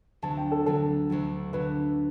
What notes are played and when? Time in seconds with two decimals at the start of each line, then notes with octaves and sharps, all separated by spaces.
0.22 D2 D3 F#3 A5
0.37 G5
0.52 A4
0.66 D2 D3 F#3 A4
1.10 D2 D3 F#3
1.53 D2 D3 F#3 B4